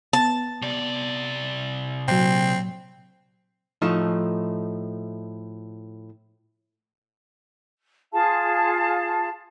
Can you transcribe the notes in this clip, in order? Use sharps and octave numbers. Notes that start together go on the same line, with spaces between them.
B3 A5
C3 D5
A#2 F#3 C4
A2 F3 A3 D#4
F4 G#4 F5 A5